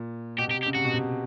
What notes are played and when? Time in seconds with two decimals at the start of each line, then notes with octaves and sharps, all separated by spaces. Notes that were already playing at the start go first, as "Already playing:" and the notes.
Already playing: A#2
0.38 B2 G4
0.48 C3
0.51 G4
0.63 G4
0.66 C#3
0.75 C3 F#4
0.84 B2
0.94 C3